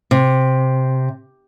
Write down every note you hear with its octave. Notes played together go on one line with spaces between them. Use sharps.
C3